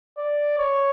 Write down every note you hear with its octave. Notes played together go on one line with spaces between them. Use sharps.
D5
C#5